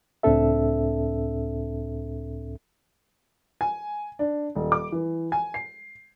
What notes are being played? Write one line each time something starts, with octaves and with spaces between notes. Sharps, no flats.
C#2 A2 C4 D4 A4 E5
G#5
D4
D#1
D6
E3
G#5
C7